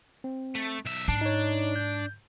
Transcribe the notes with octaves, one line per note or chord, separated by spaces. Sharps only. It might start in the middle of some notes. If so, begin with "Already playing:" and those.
C4
A3
B1 E5
G#2 D4 A5 C7
D#4 C#5
G6